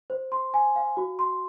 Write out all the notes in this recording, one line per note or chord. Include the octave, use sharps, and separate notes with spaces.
C5
C6
G#5
F5
F#4
C6